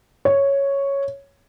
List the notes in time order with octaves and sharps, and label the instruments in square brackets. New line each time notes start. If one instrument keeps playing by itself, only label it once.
[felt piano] C#5